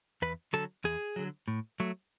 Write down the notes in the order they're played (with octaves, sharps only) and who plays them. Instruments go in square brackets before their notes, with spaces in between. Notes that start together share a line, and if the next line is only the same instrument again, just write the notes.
[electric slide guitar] E2 B4
D3 F#3 A4
E2 G#4
D3 F#3
A2
F#3 A3